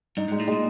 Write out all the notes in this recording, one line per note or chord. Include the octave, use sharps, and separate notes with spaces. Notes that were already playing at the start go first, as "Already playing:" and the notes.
G2 D#4
G#2
G#3
A2
A#2 G#3